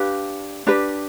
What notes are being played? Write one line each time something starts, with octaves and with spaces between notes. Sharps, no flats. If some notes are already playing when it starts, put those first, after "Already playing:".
Already playing: D4 G4 B4 F5
D4 G4 B4